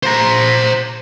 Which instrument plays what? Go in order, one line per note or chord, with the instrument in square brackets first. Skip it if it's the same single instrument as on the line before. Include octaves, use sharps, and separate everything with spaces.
[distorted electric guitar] C5 A#5